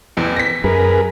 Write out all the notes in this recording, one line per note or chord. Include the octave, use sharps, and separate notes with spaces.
A1 E2
A#6 B6
F#2 G#4 A#4 B4